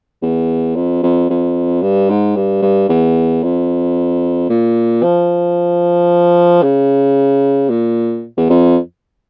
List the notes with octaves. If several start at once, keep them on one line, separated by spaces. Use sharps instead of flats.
E2
F2
F2
F2
G2
G#2
G2
G2
E2
F2
A#2
F3
C#3
A#2
E2
F2